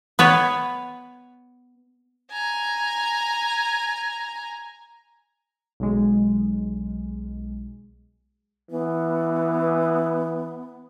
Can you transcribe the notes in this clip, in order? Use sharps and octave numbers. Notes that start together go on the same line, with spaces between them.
B3 B4 C#5
G#5 A#5
B1 G#3
E3 B3